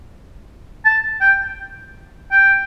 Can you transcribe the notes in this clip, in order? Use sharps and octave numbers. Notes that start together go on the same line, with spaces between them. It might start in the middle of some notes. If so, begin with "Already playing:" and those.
A5
G5
G5